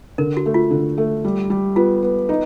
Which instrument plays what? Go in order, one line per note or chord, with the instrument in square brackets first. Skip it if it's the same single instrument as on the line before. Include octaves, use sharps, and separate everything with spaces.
[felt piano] D3 [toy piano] A#4
[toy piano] F#4
[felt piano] A3
[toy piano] F4
[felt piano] D3
A3
G3
G3
[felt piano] B3 [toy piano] F4
[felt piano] B3
D#4